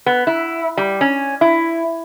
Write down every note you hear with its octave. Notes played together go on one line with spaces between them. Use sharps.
B3
E4
G3
C#4
E4